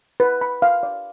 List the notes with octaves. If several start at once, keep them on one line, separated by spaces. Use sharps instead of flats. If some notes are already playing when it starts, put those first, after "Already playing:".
B4
B5
F5
D5